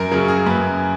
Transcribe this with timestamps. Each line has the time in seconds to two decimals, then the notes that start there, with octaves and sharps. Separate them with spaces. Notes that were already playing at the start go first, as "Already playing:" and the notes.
Already playing: F#2 A#4
0.11 C#3 F#3 A#4
0.28 G#4
0.46 F#2 B4